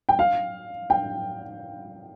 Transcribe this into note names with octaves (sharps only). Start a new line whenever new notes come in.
G5
F5
G5